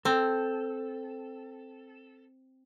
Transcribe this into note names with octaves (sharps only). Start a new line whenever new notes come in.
C4 A4